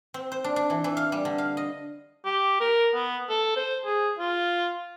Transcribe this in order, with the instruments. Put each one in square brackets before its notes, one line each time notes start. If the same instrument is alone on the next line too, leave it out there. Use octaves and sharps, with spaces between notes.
[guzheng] C4
C5
D4
D4
E3
E3
F5
G3
D3
F5
D#5
[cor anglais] G4
A#4
B3
A4
C5
G#4
F4